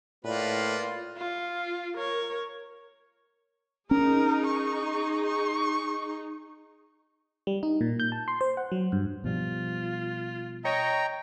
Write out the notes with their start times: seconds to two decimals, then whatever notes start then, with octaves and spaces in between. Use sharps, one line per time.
0.25 A2 A#3 F4 B4 D5
1.17 F4
1.97 A#4 C#5
3.91 C#4 D#4 G#4 A#4
4.46 C#6
5.25 C#6
7.47 G3
7.63 D#4
7.81 A#2
8.00 G6
8.12 A5
8.28 C6
8.41 C5
8.57 F#5
8.72 F#3
8.92 G2
9.24 B2 F3 G3 F4
10.65 C#5 D#5 G5 A#5